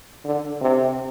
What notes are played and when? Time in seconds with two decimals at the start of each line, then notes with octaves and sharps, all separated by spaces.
0.25 D3
0.61 C3